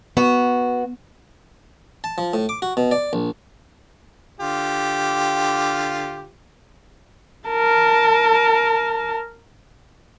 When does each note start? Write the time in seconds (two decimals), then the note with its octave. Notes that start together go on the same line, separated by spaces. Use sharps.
0.17 B3 F#4
2.04 A5
2.18 F3
2.33 A2
2.49 D6
2.62 F#4
2.77 B2
2.91 D5
3.13 A#1
4.40 D3 F4 G4
7.48 A#4 A5